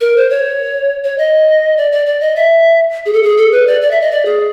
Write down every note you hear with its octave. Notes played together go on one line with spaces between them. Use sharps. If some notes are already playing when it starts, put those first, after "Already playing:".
A#4
C5
C#5
C#5
D#5
D5
D5
D5
D#5
E5
G#4
A4
G#4
A4
B4
D5
D5
E5
D#5
D5
G#4